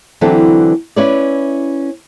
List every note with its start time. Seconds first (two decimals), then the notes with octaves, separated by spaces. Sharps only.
0.21 D3 E3 F#3 C4 A4 B4
0.96 C#4 E4 B4 C#5 D5